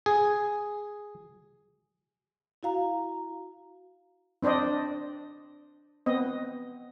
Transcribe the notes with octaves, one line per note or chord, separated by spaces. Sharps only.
G#4
E4 F#4 F5 A#5
C4 D4 C5 D5 D#5
B3 C4 D#5